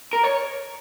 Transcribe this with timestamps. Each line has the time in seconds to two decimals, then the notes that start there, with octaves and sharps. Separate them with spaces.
0.13 A#4
0.23 C#5